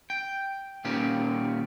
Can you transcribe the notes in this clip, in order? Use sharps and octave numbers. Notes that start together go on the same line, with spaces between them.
G5
A#2 D#3 C#4 G4